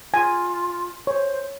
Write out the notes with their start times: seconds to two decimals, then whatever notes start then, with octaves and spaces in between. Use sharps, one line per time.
0.14 F4 G#5
1.07 C5 C#5